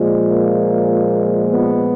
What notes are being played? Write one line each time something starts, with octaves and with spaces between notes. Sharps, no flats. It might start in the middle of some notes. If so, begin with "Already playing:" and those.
Already playing: A#2 F3 G#3
A#3
B3